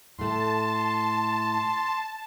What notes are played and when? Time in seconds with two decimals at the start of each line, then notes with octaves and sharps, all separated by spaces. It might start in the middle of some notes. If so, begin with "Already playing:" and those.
0.19 A2 A3 A5 C6